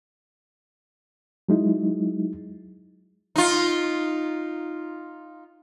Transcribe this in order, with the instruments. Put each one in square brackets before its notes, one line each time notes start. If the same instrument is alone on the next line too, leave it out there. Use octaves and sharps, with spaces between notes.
[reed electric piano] F#3 G#3 D#4 E4
[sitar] D#4 F4